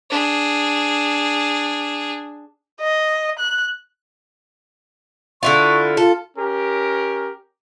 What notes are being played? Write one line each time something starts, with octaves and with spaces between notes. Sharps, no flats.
D4 G#4
D#5
F#6
D3 E4 F4 C#6
F4 A4
C#4 G4 A#4